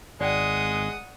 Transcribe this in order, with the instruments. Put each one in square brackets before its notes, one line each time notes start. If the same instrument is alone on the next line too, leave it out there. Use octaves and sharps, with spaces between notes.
[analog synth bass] G#1 [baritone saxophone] G#3 [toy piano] D5 G5 [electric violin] F#5 D#6